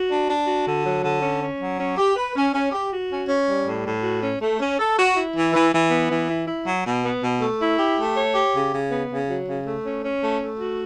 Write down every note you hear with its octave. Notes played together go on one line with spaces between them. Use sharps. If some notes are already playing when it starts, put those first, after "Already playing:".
Already playing: F#4
D4
D4
F#4
D3
F#3
D3
C#4
C#4
F#3
C#4
G4
B4
C#4
C#4
G4
F#4
C#4
C#4
G3
A2
A2
F#4
C#4
A3
C#4
A4
F#4
E4
E3
E3
E3
B3
E3
E4
E4
F#3
B2
B3
B2
A3
E4
G4
A3
C#5
G4
C#3
C#3
B3
C#3
F#3
C#3
A3
C#4
C#4
A3
A3
F#4